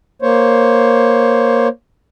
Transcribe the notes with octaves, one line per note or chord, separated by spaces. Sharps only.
A#3 C5 C#5